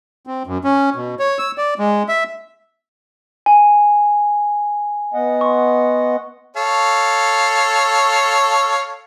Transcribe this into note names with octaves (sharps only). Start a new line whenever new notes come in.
C4
F#2
C#4
B2
C#5
E6
D5
G#3
E5
G#5
B3 D#5 F#5
C6 C#6
A4 C#5 F5